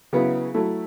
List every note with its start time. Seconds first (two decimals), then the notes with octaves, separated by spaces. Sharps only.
0.13 C#3 F#3 B3 E4
0.54 F#3 A3 E4